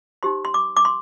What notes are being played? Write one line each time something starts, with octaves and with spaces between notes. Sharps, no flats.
D#4 G4 C5 C6
C6
D6
D6
C6